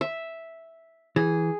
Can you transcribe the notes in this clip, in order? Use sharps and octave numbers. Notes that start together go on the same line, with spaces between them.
E5
E3 G#4